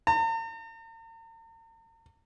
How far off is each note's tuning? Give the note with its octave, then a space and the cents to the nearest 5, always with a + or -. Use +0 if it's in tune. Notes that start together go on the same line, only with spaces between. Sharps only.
A#5 -45